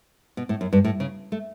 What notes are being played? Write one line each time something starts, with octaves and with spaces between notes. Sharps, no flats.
B2
A2
F#2
G2
A2
C#3
A3